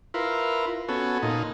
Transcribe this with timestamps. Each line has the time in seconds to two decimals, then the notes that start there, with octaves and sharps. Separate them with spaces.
0.14 E4 F4 A#4 B4
0.89 B3 C#4 F#4 A4
1.23 A#2 D#4